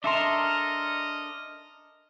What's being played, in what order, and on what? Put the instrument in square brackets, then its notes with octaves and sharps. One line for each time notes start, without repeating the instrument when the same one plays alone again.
[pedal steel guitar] D4 A4 A#4 [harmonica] D#5 [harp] E5 C6